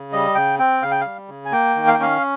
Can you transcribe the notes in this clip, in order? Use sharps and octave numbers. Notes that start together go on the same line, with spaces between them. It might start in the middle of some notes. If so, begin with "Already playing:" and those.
Already playing: C#3
G3 D#5
C#3 G5
C4 G5
C#3 F5
G5
G3 F5
C#3
G#5
A#3 G5
D#3
F5
G5
C#4 F5